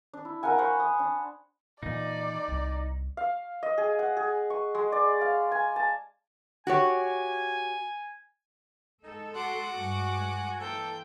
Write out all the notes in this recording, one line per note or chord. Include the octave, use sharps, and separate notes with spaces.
D4
E4
A#4 F5 F#5 G#5
C5 F#5 B5 C#6
D#6
D4
A#2 E3 D#4 D5
C2
F5
D#5
G#4
F#5
G#4
C#6
G#3
D5
F5
G#5
A5
F#4 G4 C#5 G#5
G#3 D#4 A4
F#4 F#5 C6 D6
G2 G#3 G#5
E3 A#3 D4 A4 C5 G5